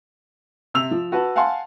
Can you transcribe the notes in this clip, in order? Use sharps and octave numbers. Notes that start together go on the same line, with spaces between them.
C3 E6 F7
F3
F#4 B4 A5
F5 F#5 G#5 A5 C6